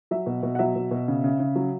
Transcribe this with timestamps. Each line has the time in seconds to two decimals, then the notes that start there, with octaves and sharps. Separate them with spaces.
0.11 F#3 E5
0.26 B2
0.43 B2
0.55 F#5
0.59 F#3 E5
0.76 B2
0.91 B2
1.08 C#3
1.24 C#3
1.40 C#3
1.56 F#3